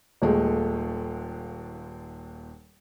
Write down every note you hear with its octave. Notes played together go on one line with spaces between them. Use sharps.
D#1 D#2 G#3 A3